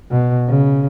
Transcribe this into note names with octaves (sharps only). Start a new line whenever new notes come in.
B2
C#3